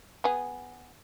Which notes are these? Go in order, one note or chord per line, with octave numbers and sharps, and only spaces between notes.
B3 G#4